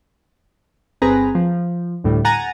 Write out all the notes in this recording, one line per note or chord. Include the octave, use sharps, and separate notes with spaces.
G1 C4 G#4 B4 A#5
F3
D2 A2 G3
F#5 G#5 A#5 A6 D#7